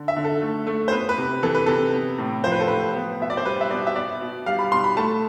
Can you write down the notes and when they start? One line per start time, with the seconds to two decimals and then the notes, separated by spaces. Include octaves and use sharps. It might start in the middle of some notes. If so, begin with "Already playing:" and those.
Already playing: D3
0.08 E5
0.16 D3
0.24 A4
0.41 A3
0.67 A3
0.88 C5
0.92 B3 B4
1.09 B4
1.18 C3
1.43 E3 A4
1.55 B4
1.66 C3 A4
1.94 B3
2.18 A2
2.44 F3 C5
2.52 B4
2.60 A4
2.68 A2 B4
2.95 B3
3.20 B2 E5
3.30 D5
3.37 C5
3.45 G3 B4
3.61 E5
3.71 B2 D5
3.87 E5
3.96 B3 D5
4.21 B2
4.46 G3 F5
4.59 B5
4.71 B2 C6
4.84 B5
4.97 A3 A5